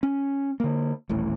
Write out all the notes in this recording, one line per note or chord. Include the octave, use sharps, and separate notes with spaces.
C#4
D3 A#3
D#1 A1 A2